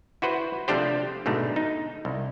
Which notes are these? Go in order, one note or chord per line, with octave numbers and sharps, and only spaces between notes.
E4 F#4 B4 C5
C3 F3 A3 D4 G4 C5
G#2 B2 D3 A3
D#4
C2